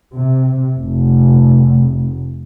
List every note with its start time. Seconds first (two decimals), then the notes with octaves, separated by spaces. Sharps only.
0.13 C3
0.78 F1